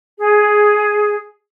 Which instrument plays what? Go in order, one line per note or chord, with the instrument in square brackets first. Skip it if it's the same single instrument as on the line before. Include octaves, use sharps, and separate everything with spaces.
[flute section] G#4